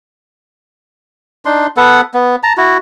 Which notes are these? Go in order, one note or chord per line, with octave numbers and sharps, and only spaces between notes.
D4 D#4 C6
B3 A4 B4 F#5
B3
A5 A#5
E4 F#4